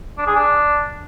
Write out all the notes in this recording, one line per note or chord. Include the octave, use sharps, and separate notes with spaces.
D4
G#4
D4